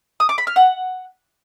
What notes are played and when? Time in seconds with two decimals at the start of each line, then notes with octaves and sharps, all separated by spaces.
0.20 D#6
0.29 D6
0.38 B5
0.47 F6
0.56 F#5